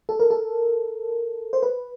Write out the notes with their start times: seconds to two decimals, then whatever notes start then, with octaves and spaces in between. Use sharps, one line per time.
0.09 A4
0.20 A#4
0.30 A4
1.53 C5
1.63 B4